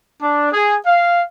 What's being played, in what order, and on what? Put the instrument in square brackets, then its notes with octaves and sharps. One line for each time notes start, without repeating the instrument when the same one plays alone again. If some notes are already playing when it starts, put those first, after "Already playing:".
[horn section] D4
G#4
F5